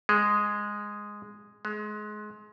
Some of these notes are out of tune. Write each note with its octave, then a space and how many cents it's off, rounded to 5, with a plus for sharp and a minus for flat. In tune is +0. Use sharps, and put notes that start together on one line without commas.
G#3 -5
G#3 +25